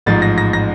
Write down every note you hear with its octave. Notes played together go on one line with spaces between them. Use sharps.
A1 G#2 F3 A6
A#6
A#6
A#6